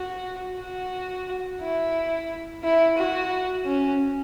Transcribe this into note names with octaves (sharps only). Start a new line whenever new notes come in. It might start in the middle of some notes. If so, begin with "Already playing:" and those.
Already playing: F#4
F#4
E4
E4
F#4
C#4